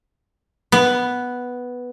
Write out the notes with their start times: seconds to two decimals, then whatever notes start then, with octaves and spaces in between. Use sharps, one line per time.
0.72 B3